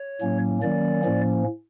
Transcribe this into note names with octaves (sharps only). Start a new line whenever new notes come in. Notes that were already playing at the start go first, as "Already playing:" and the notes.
Already playing: C#5
A2 F#3 A#3 C#4
D#3 F#3 A#3 C#4 D5
A2 F3 A#3 C#4